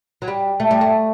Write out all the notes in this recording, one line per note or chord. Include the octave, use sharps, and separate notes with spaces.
F#3
G3
A3
G3
A3